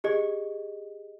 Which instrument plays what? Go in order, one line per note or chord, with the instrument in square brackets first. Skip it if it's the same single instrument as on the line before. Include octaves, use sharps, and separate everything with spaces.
[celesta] G4 G#4 D#5